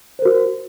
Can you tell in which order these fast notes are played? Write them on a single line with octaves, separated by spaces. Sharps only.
C5 A#4 F#4